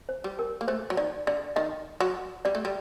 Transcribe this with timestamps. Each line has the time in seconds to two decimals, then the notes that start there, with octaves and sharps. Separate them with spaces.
0.09 C5
0.24 G3
0.39 A#4
0.61 A#3
0.68 A3 C5
0.90 F#3
0.97 D#3 D5
1.27 D3 D5
1.56 D#3 D#5
2.00 F#3
2.45 G3 D5
2.55 A3
2.65 G3